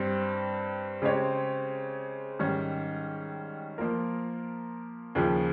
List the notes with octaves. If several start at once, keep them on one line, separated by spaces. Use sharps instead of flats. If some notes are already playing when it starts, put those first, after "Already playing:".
Already playing: G2 G3 C4
C#3 G#3 C4 G4 C#5
G#2 D#3 G3 C#4
F3 A#3 F4 A#4
D#2 C#3 F3